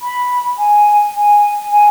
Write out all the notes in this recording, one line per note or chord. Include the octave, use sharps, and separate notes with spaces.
B5
G#5
G#5
G#5